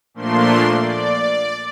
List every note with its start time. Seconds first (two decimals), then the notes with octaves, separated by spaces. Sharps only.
0.14 A#2 F3 A3 A#3 D4 C6
0.78 D5